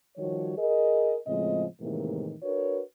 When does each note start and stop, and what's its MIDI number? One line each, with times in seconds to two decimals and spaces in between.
0.17 0.53 51
0.17 0.53 53
0.17 0.53 55
0.17 0.53 66
0.17 0.53 73
0.57 1.17 68
0.57 1.17 70
0.57 1.17 75
1.27 1.65 45
1.27 1.65 49
1.27 1.65 53
1.27 1.65 56
1.27 1.65 60
1.27 1.65 75
1.80 2.35 45
1.80 2.35 48
1.80 2.35 51
1.80 2.35 52
1.80 2.35 56
1.80 2.35 58
2.43 2.80 62
2.43 2.80 66
2.43 2.80 70
2.43 2.80 71
2.43 2.80 73